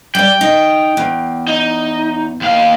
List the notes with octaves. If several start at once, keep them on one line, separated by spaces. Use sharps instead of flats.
G3 D5 G5
D#4
E2
D#4
D#2 F5